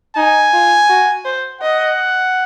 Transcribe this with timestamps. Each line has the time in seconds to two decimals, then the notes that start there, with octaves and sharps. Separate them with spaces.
0.16 D#4 G#5
0.53 F4
0.89 F#4
1.25 C5
1.61 D#5 F#5